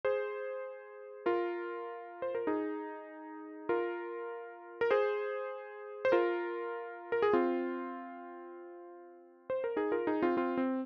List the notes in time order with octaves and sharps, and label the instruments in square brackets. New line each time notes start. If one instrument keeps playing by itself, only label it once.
[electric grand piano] G#4 C5
F4 A#4
C5
A#4
D#4 G#4
F4 A#4
A#4
G#4 C5
C5
F4 A#4
A#4
G#4
C4 F4
C5
A#4
D#4 G#4
F4 A#4
D#4 G#4
C4 F4
C4 F4
C4